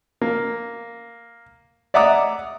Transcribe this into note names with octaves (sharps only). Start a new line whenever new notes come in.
A#3
D5 E5 F#5 A#5 D6 D#6